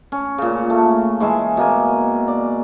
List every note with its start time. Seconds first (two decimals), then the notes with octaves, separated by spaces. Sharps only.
0.12 C#4
0.38 A#2 C#3
0.70 A3
1.20 E3 G#3 G#4 E5
1.57 B2 A#3 G#5
2.28 D5